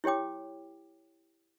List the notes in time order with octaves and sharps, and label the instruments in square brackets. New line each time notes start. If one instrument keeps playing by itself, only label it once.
[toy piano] E4 G4 C#5 G5 D6